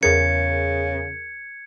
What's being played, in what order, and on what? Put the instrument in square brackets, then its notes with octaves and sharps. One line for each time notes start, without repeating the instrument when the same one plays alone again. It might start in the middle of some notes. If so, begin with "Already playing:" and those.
[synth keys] E2 G#4 A#4 [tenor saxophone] C#3 [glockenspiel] G#6 C#7